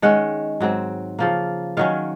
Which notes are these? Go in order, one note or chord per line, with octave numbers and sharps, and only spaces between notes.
D#3 G#3 C#4 F#5
G#2 F#3 C4
C#3 F3 A#3
D#3 F#3 C#4 F5